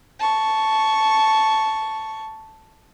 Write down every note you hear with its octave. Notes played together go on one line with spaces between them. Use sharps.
A5 C#6